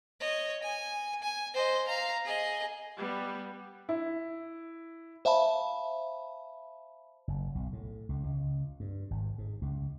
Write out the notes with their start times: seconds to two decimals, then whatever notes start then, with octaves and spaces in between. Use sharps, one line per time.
0.20 C#5 D#5
0.63 G#5
1.22 G#5
1.54 C5 D#5
1.88 F5 A#5
2.25 G#4 D#5
2.97 G3 B3
3.89 E4
5.25 C5 E5 F5 A5 B5
7.28 F#1
7.55 B1
7.73 A2
8.09 C#2
8.24 C#2
8.80 G2
9.11 G#1
9.38 G#2
9.62 C#2